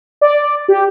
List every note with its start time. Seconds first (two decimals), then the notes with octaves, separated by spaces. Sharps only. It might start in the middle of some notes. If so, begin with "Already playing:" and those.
0.21 D5
0.68 G4